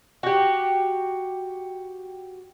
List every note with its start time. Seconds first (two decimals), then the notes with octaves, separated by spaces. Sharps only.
0.23 F#4 G4